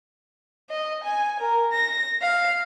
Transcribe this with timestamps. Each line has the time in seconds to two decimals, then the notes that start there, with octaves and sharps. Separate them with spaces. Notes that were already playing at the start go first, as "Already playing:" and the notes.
0.70 D#5
1.04 G#5
1.40 A#4
1.73 A#6
2.22 F5